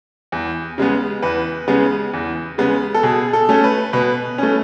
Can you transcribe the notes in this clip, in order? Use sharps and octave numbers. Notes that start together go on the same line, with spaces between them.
E2
C#3 G#3 B3
E2 B4
C#3 G#3 B3
E2
C#3 G#3 B3
A4
B2 G#4
A4
A3 C#4
B4
B2 B4
A3 C#4